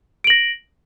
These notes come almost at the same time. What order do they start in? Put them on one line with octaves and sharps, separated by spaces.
D7 F#7 A#6